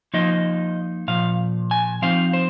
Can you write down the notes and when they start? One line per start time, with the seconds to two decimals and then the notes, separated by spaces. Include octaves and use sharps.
0.14 F3 A#3 D#4 D#5
1.08 A#2 F3 F5
1.71 G#5
2.02 F3 C4 D#4 F5
2.33 C5